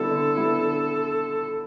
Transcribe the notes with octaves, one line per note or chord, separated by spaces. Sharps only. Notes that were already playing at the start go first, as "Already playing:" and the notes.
Already playing: D3 G3 B3 E4 A4
D3
G3 B3 E4
D3